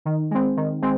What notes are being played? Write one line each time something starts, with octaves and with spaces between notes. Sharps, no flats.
D#3
G#3 C4
D#3
G#3 C4